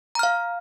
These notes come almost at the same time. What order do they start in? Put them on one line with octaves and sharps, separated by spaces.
A#5 F6 F5